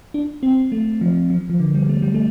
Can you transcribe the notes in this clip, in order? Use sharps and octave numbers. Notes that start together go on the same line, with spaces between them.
D4
C4
A3
F3
F3
F3
D3
G3
A3
G3
A3